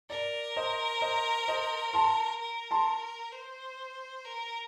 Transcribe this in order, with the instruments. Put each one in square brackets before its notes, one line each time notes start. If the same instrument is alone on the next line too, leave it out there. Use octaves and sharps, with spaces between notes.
[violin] A#4 [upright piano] D5
[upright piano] C5 D#5
C5 D#5
C5 D#5
A5 C6
[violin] A#4
[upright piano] A5 C6
[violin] C5
A#4